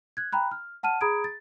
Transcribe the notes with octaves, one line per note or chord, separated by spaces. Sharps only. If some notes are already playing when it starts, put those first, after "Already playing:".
F#6 G#6
G5 A#5 B5 F#6
F6
F#5 A5 F6 D#7
G#4 A#5 B5 D#6 G#6 D7
A6